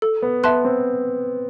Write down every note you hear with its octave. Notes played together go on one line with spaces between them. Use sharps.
A4
B3
B3 E5 A5 C6 F#6
C4